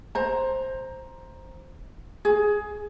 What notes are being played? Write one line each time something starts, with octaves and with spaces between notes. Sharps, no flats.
C5 A#5
G#4